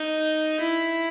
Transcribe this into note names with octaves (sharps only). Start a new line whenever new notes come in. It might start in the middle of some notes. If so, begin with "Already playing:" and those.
Already playing: D#4
E4